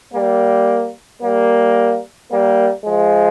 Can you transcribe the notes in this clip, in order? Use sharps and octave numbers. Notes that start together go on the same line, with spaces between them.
G3 A#3
G3 A#3
G3 A#3
F3 G#3